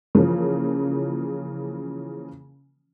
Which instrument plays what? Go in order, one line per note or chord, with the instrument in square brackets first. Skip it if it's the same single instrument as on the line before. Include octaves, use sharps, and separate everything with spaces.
[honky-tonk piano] C#3 E3 F3 A#3 C#4